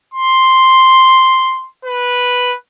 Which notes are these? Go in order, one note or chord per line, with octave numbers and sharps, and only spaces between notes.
C6
B4